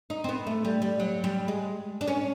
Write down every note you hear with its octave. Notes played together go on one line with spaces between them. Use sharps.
D#4
C4
B3
A3
G3
G3
F#3
G3
G#3
D4
C#4